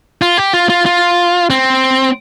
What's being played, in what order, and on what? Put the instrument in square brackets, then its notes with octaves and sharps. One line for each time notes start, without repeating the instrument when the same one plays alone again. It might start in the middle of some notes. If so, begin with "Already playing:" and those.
[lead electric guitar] F4
G4
F4
F4
F4
C4